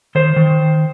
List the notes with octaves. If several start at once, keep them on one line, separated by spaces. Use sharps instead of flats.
D#3 C5
D#3